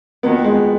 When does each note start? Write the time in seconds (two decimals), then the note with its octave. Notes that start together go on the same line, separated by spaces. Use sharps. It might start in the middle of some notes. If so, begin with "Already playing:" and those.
0.23 F2 D#3 A#3 B3 D#4 F#4
0.44 G#3